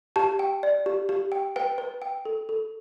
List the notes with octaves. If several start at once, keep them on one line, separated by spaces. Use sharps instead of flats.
G4 A5
G5
D5
G4
G4
G5
B4 G5
B4
G5
A4
A4